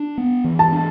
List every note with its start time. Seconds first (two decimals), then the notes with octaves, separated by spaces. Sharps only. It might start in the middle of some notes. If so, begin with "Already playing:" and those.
Already playing: D4
0.18 B3
0.44 E3
0.59 A5
0.72 D4